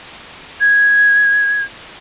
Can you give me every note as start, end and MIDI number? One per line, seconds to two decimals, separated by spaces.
0.61 1.63 92